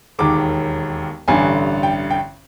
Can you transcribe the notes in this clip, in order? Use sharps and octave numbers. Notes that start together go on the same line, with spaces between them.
E1 D#2 D#3 D6
A1 G2 D3 G#5
G5
G5